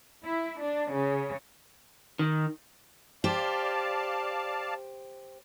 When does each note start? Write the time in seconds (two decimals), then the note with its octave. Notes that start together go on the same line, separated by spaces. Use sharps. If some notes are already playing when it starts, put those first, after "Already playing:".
0.24 E4
0.60 D4
0.91 C#3
2.19 D#3
3.24 G4 C5 D5 F5 A5